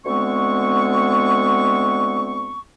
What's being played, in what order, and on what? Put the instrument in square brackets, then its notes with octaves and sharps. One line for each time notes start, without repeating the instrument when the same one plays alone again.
[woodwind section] D2 G#3 B3 C4 C#6